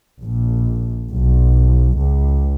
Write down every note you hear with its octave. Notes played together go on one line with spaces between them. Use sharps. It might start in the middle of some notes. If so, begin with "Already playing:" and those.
A#1
B1
C#2